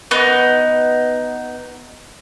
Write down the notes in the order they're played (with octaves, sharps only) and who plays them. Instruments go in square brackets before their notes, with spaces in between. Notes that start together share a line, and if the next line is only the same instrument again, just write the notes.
[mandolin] B3 D#4